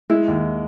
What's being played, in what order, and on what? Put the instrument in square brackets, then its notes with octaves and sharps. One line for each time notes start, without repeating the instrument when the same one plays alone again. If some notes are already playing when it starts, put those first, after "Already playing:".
[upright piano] G#3 [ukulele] E4
[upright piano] D#2